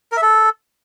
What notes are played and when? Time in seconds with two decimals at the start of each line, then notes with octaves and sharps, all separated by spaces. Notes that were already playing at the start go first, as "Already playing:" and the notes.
0.12 A#4
0.17 E5
0.22 A4